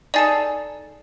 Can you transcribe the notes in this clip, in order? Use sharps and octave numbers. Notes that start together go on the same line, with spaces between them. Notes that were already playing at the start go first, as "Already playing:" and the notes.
D#4 G#4 A4 D5 A6